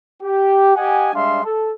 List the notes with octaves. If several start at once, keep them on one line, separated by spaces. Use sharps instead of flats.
G4
G4 D#5 F#5 G#5
G3 G#3 D4 E5 F5 C6
A4